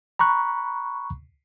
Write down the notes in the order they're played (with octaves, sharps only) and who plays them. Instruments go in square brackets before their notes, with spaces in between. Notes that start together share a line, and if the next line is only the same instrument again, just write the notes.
[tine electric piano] A#5 B5 C#6 F#6